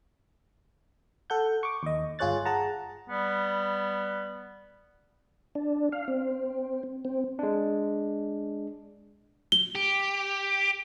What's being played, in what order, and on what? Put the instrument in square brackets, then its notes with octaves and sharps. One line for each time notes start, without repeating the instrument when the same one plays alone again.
[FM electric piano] A4 F#5 G6
C#6 D6
D#2 D#5
G1 F4 G#4 C#5 F#6 A6
G#4 F#5 A5 A#5
[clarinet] G3 [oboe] B3
[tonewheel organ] D4
F5
C4
C4
[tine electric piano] G#3 D4
[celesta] G7
[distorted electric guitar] G4